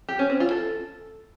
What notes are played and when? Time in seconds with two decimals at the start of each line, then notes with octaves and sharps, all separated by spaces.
0.09 G4
0.19 C#4
0.30 C4
0.40 F4
0.51 A4